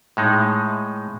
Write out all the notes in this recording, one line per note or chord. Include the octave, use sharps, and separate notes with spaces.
A2 G#3 D#4